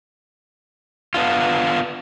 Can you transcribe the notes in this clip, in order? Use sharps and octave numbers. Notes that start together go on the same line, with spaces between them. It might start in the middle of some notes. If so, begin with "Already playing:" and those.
B3 D4 F4